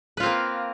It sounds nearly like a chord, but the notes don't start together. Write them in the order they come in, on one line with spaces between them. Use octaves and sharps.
B4 F4 C4 A#3